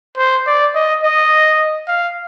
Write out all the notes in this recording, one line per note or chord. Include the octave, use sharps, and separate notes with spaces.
C5
D5
D#5
D#5
F5